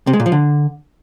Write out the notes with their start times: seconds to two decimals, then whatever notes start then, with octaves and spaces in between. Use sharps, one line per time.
0.07 C3
0.13 G#3
0.20 A#2
0.26 F3
0.32 D3